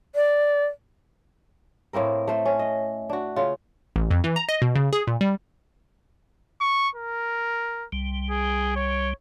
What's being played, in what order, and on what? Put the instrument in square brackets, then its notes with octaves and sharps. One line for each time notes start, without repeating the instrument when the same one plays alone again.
[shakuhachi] D5
[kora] A2 A#3 C4 A#4
A3 C5
C#4
D#5
D4 F#4
C#3 F4
[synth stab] A1
F2
E3
A#5
D#5
B2
C#3
G#4
A#2
G3
[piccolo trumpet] C#6
A#4
[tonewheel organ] C2 G3
[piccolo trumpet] G#4
C#5